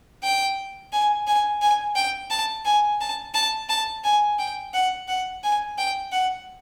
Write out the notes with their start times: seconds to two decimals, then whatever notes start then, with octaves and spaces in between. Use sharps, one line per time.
0.23 G5
0.93 G#5
1.27 G#5
1.62 G#5
1.96 G5
2.31 A5
2.65 G#5
3.01 A5
3.34 A5
3.69 A5
4.04 G#5
4.39 G5
4.74 F#5
5.08 F#5
5.44 G#5
5.78 G5
6.12 F#5